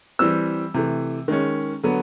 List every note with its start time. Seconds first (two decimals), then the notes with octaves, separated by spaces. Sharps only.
0.19 E3 G3 C4 E6
0.74 C3 E3 A3
1.28 D#3 G#3 C#4
1.83 D3 F#3 B3